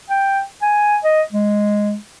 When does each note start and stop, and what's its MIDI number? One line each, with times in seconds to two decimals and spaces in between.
0.10 0.41 79
0.62 0.97 80
1.04 1.22 75
1.32 1.95 56